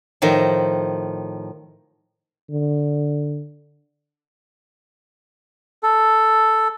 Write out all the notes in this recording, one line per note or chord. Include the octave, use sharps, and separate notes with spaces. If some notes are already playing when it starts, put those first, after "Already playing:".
A2 D#3 F3
D3
A4